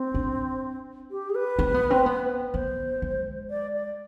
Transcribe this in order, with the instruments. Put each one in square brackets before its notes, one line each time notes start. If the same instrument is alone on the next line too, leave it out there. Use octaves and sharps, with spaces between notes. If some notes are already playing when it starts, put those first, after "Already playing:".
Already playing: [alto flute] C4
[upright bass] D4
[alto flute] G4
G#4
B4
[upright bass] C4
B3
C4
B3
[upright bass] B3 [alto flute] C5
[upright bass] G#3
[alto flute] D5
D5